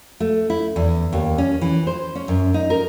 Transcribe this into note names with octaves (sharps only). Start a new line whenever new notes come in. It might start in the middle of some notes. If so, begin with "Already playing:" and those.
A3
E4
E2
D#2
C#4
E3
C5
C#4
F#2
D#4
A#4